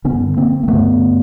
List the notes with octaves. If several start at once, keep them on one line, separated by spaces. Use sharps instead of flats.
D3 B3 C#4
G2
A#3 C4
A#3
G2 D3 A3 B3